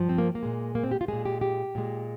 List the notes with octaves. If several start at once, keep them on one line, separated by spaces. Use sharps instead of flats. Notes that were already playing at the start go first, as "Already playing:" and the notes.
Already playing: G2 F3
C4
A#3
A#3
A#2 G#3
A#3
C4
G4
F4
A#2 G#3 G#4
G4
G4
A#2 G#3